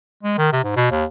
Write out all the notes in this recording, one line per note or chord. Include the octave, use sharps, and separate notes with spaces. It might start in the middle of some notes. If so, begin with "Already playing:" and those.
G#3
D#3
C3
G#2
B2
D#2